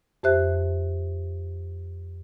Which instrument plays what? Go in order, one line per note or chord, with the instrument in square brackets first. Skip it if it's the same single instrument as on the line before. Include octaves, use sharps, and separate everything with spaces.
[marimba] F2 G4 C5 E5 F#6